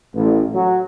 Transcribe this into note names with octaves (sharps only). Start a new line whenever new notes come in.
A1
F#3